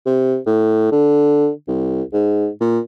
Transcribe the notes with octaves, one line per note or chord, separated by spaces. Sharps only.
C3
A2
D3
C2
G#2
A#2